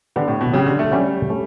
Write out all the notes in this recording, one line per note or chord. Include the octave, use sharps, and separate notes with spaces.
D3 B3 D4 G4 B4
A2
B2
C#3 F#3 C#4 G4
D3
A3
F#3 G3 C#4 G4
A3 C#4